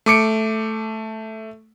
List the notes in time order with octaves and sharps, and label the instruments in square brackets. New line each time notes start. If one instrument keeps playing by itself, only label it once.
[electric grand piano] A3 D6 C#7 D7